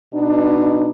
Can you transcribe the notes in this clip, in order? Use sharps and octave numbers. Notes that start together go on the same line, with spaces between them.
B2 D4 D#4